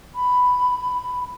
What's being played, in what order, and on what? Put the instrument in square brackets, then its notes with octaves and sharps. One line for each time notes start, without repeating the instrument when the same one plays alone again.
[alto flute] B5